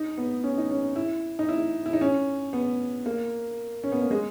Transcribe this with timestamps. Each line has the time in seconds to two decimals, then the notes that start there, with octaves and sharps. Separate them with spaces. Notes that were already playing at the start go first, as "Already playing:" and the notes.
Already playing: D#4
0.18 B3
0.44 C#4
0.58 D#4
0.71 C#4
0.96 E4
1.39 D#4
1.49 E4
1.86 E4
1.93 D#4
2.01 C#4
2.53 B3
3.06 A#3
3.84 C#4
3.92 B3
4.01 A#3
4.11 G#3